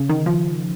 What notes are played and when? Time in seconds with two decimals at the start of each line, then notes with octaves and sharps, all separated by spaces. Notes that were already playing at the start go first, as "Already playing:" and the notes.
Already playing: C#3
0.09 D#3
0.26 F3